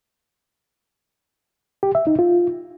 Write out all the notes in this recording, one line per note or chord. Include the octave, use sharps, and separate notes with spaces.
G4
E5
D#4
F4